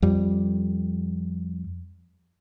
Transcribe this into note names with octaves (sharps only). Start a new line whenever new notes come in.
F2 G3